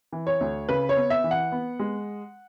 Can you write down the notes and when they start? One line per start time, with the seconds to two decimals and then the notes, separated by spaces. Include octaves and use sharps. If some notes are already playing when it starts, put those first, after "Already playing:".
0.12 E3
0.27 C#5
0.41 D2
0.69 C#3 B4
0.89 C#5
0.96 B3
1.10 E5
1.24 E3
1.31 F#5
1.52 B3
1.79 G#3